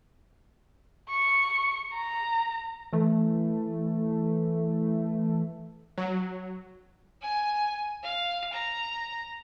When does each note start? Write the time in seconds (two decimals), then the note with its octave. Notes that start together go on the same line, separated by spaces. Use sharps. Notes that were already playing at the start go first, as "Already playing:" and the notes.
1.10 C#6
1.94 A#5
2.93 E3 A3
5.98 F#3
7.22 G#5
8.03 F5
8.52 A#5